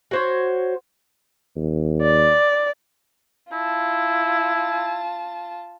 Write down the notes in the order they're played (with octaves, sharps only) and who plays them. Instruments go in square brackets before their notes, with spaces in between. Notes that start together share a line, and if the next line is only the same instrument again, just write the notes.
[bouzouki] F#4 C5 C#5
[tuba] D#2
[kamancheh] D5
[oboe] E4 [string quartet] F4 A5